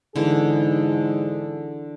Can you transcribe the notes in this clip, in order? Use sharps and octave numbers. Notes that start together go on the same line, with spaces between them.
G#2 D3 E3 G#4